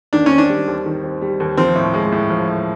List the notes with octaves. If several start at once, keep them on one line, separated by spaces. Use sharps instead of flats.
D#3 D4
C#4
C4
D4
G3
D#2
D#3
C4
G3
D#2
F3 C4
A2
G#3
A2
F3
A2